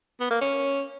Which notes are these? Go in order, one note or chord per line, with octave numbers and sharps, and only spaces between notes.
B3
A#3
C#4